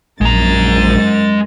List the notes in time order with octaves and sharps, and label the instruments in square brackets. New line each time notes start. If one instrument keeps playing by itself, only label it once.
[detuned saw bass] A#1 [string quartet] F#2 A#4 A6 [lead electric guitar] G#3 A#5